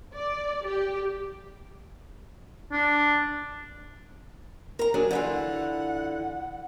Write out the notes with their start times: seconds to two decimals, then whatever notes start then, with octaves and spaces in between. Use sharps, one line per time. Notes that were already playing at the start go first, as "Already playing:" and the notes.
0.16 D5
0.67 G4
2.72 D4
4.79 A#4 A#5
4.94 F#3 D4 G#4
5.11 D3 E3 F4 F#5